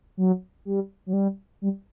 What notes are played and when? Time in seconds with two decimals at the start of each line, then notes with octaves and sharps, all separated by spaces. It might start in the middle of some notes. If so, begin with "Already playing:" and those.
0.17 F#3
0.65 G3
1.06 F#3
1.13 G3
1.62 G3